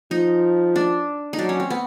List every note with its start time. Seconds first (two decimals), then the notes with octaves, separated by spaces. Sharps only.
0.11 F3 D#4
0.76 D4
1.33 D#4
1.39 F#3 D4
1.49 C#4
1.60 C4
1.70 B3